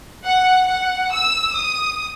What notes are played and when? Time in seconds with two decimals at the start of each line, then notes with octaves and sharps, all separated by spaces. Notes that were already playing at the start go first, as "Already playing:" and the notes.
0.23 F#5
0.66 F#5
1.11 E6
1.54 D#6